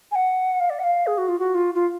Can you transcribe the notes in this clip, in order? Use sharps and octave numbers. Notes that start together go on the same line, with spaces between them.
G#5
F#5
F5
D5
F#5
F5
G#4
F#4
F4
F#4
F4
F4